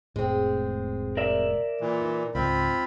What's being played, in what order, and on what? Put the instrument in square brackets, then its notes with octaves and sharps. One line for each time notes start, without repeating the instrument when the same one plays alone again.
[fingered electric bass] F1 A2 [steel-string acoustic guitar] G#3 C4
[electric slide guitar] A#4 D5 E5
[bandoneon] A#2 E3
[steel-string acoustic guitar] D#4
[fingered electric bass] C#2 [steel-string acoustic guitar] G#2 [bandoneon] C4 F4 B5